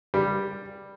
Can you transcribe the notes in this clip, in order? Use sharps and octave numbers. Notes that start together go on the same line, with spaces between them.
G3